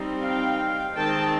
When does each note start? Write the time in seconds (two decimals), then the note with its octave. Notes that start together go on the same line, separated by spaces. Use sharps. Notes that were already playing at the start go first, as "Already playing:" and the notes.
Already playing: G3 C4 D#4
0.22 F5 G5
0.95 D#3 G#3 C4 G5 A5